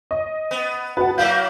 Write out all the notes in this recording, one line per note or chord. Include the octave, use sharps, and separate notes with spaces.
D#5
B3
F#4 B4 F#5 A5
F#3 A#3 E4 F5 G6